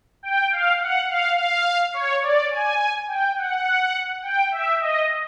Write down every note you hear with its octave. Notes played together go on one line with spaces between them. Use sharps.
G5
F5
F#5
F5
F5
C#5
D5
G#5
G5
F#5
G5
E5
D#5